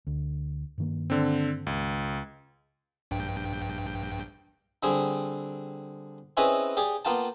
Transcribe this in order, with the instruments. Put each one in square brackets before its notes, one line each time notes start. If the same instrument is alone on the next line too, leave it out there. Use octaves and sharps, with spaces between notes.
[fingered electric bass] D2
G2 D#3 A#3
[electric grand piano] D3 C4
C#2
[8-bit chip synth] A#1 G2 G5
[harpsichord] D3 G3 C4 G#4
C4 C#4 E4 G#4 B4 D#5
G4 G#4 D5
A#3 B3 F4 G5 A5